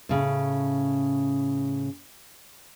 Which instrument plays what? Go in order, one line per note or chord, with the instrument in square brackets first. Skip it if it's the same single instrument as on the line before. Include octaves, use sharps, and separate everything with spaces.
[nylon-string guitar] A2 C#3